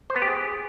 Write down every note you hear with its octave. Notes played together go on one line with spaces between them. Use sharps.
C5
B3
G4
G#4